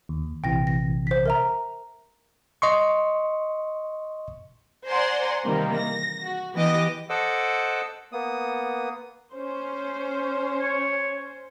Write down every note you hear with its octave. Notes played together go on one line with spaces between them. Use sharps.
D#2
A#1 C3 E3 G5 A#6
A#6
C5 B6
A#4 E5 A#5
D#5 C6 C#6
C5 D5 F#5 G#5 A#5 C6
C3 D#3 E3 G3 A#3 C4
A#6
F#4
E3 B3 G4 D#5 D6 A#6
A4 C5 D#5 F#5 D6 E6
A#3 B3 D#6
C#4 C5
C#5